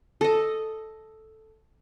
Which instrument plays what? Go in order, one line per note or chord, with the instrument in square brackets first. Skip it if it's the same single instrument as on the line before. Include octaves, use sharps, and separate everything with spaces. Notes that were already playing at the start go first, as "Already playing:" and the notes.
[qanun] A4 D#5